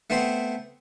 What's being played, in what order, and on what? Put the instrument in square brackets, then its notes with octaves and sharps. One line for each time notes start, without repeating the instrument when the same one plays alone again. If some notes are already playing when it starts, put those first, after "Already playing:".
[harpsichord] A3 B3 C4 C5 C6